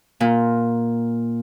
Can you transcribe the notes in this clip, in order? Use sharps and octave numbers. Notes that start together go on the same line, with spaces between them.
A#2